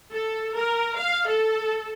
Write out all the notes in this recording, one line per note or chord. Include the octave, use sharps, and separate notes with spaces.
A4
A#4
F5
A4